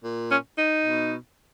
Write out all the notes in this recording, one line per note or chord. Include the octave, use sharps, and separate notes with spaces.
A#2
C#4
D#4
B2